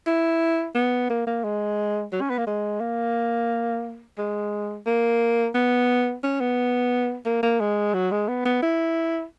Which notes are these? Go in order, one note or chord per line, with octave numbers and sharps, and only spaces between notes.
E4
B3
A#3
A#3
G#3
F#3
C#4
B3
A#3
G#3
A#3
G#3
A#3
B3
C#4
B3
A#3
A#3
G#3
F#3
G#3
B3
B3
E4